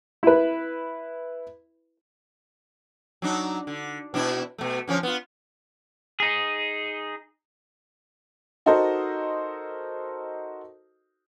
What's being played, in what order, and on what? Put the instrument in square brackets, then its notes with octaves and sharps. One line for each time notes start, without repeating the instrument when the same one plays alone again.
[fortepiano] E4 B4
[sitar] F#3 D4 D#4
D3
B2 D4 E4
B2 A3
D3 F3 C#4
B3 F4
[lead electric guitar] D#4 G#4
[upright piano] D#4 F#4 A4 A#4 C5 D#5